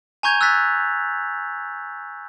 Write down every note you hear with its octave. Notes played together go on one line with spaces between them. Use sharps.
G#5 A#5 C#6 G6 G#6 F7
E6 F#6 G#6 A6 B6